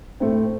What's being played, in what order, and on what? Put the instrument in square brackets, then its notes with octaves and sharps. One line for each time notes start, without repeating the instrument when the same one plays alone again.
[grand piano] A2 A3 C4